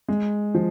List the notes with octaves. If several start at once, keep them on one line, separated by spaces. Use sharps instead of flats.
G#3
F3